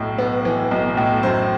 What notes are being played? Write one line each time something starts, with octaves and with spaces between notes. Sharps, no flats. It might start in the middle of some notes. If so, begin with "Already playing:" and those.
Already playing: B1 A2
B3
E3
B1
A2
F#2 C5